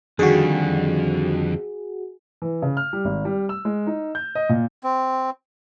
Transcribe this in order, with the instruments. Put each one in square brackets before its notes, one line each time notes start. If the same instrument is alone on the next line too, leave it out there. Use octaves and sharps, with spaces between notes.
[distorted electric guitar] F2 [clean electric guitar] D3 D#3 G3 [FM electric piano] F#4 G#4
[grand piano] E3
C#3
F6
G3
G#1
G3
E6
G#3
D#4
G6
D#5
A#2
[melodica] C4